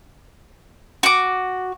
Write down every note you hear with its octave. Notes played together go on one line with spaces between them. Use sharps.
F#4 D6